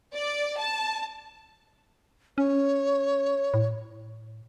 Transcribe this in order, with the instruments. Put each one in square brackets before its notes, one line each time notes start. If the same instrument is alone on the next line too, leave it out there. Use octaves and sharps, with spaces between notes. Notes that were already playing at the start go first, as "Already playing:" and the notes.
[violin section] D5
A5
[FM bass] C#4 [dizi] C#5
[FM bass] A2